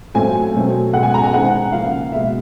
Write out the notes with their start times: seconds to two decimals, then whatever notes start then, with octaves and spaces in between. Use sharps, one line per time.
0.14 A#2 F#3 A3 C4 G#5
0.54 B2 F#3 A3 C4
0.93 B2 G#3 B3 F#5
1.03 G#5
1.14 A#5
1.23 G#5
1.34 D#3 G#3 C4 F#5
1.72 C#3 F3 A#3 F5
2.12 B2 G#3 B3 E5